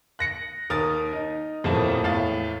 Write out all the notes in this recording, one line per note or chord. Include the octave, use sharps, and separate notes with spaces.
F#6 A#6 C#7
D#2 A#4 D#6 F6 A6
D#4
D#1 F2 A2 F3 A#3 A5
E2 A2 F5 A6